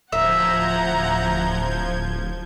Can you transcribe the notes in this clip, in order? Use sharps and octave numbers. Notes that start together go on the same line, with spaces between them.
D1 F3 E5 F#5 A#5 G6 G#6